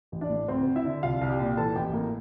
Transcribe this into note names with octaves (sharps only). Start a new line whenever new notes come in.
A1
D4 D5
A2
D2 C4 C5
D2
E4 E5
D3
C2 F4 F5
C2
G4 G5
A#2
E3 A4 A5
A1 G4 G5
A2 A#3 A#4